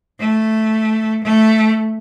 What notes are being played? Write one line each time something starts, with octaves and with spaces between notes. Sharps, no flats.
A3
A3